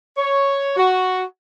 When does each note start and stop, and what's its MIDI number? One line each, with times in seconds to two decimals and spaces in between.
0.17 0.74 73
0.77 1.23 66